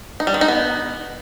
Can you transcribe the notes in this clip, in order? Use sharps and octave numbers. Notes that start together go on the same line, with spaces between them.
D#4
G3
D#3
D#4
B3